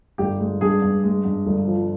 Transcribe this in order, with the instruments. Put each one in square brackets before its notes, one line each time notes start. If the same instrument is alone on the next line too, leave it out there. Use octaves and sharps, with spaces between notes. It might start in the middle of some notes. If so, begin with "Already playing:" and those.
[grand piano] G1 G4
G#3
G2 G#4
G2
G#3
G2
G1
F3